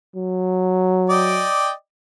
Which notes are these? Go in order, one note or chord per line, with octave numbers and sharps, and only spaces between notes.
F#3
D5 D#5 G5